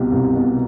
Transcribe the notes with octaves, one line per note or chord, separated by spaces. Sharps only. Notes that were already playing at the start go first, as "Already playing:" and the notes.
Already playing: C2 B2 F4 G4
C2
B2